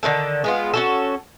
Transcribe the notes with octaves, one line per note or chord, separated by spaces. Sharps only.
D3 D#3 G#3 A4
G#3 B3 F4
C#4 F#4 A4